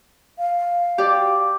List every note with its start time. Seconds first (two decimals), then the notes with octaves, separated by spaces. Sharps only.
0.38 F5
0.98 G4 D5